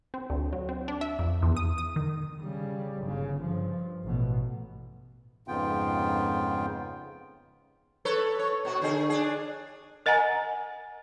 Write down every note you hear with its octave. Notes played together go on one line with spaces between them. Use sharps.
C4
D2
F#3
C4
D4
E5
F2
E2
D#6
D#6
D#3
C#3 G3
G1 C#3
G2 F3
A1 B2
F2 G#2 C#3 B3 F4 G5
A4 B4 C#5
C#5
B2 F#4
D3 G#4
D4 G#4
A#4 D#5 F#5 G#5 A#5